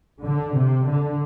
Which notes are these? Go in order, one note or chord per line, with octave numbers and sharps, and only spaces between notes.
D3
C3
D3